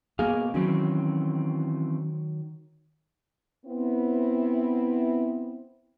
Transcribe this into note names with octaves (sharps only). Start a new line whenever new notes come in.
B2 A#3 G#4 F5
D#3 E3 F#3 C4 C#4
B3 C4 E4